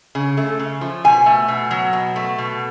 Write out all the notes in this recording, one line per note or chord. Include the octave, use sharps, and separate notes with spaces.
C#3
A3
C#3
F3
B2 G#5
A3
B2
F#3
B2
A3
B2